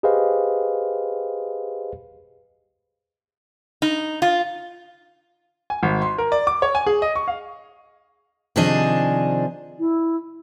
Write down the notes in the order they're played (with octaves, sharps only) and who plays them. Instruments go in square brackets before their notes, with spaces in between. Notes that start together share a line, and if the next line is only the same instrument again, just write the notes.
[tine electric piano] G4 G#4 B4 C5 D#5 F5
[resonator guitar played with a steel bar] D#4
F4
[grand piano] G#5
G#1
C6
A#4
D5
D6
C#5
G#5
G#4
D#5
C#6
F5
[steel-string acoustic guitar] C3 D#3 F3 D4 G#4 D#5
[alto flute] E4